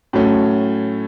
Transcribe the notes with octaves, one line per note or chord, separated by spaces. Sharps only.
A2 F#3 A3 C#4